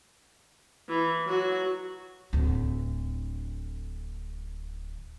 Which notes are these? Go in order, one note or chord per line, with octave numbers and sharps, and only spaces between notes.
E3
F#3 F#4
D1 D2